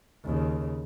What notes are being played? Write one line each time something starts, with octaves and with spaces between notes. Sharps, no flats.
D#2 C#3